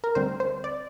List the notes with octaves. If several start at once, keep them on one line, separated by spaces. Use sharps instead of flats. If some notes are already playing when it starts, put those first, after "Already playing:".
A#4
D2 D3 G3 C4 C5
C5
D5